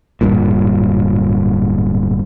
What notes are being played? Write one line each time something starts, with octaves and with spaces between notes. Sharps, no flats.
D1 G2 A#2